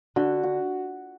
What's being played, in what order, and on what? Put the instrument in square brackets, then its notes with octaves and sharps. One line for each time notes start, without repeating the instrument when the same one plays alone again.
[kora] D3 [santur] F#4
[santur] F#4